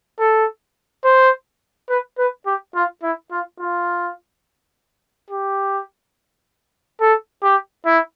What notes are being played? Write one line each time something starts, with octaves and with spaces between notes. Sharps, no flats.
A4
C5
B4
B4
G4
F4
E4
F4
F4
G4
A4
G4
E4